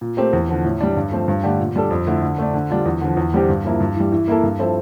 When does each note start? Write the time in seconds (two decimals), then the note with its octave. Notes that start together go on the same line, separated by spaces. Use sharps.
0.01 A#2
0.17 A3 C4 G4 A#4
0.33 E2
0.49 D3 F3
0.64 A2
0.81 G3 D4
0.96 G2
1.12 F3 A3 C4
1.28 G2
1.43 D3 A3 D4 G4
1.59 A#2
1.76 G3 D4 A4
1.90 F2
2.07 D3 A3 E4
2.22 D3
2.38 A3 D4
2.54 D3
2.70 G3 D4 F4
2.86 E2
3.01 D3 F3
3.17 E2
3.33 D3 G3 C4 G4
3.49 G2
3.65 F3 A#3 E4
3.80 G2
3.96 E3 G3
4.12 E3
4.28 A#3 E4 A4
4.43 G2
4.59 F3 C4 E4 A4